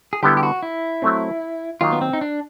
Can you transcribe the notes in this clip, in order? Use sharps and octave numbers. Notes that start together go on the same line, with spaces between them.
G#4
D3 G3 B3 E4 G4 A4
G4
F#4
E4
F#3 A3 C4
D#3 F#3 A#3 D#4 F4
B3
C4
D#4
D4